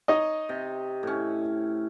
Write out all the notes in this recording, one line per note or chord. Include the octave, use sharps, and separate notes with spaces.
D#4 C#5 D#5
C3
A2 C#4